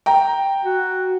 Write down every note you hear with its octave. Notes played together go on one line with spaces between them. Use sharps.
G5 A#5
F#4